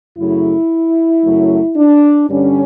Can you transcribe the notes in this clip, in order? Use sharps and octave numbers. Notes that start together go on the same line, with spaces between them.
F#2 C#3 F#3 A3 E4
F#2 C#3 F#3 A3
D4
G2 D3 G3 C#4